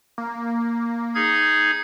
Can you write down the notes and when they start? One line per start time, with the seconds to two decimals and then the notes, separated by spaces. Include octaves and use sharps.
0.18 A#3
1.15 D#4 G#4 G#6